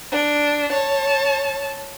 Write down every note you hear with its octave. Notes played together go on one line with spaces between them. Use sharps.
D4
C#5 A5